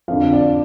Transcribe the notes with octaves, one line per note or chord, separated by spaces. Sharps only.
F2 D3 F5
D5